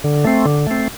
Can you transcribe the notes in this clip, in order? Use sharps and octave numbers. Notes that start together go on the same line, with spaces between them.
D3
A3 C4
D3
A3 C4